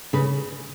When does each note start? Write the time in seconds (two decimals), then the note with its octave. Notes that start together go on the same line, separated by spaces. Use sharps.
0.13 C#3 B4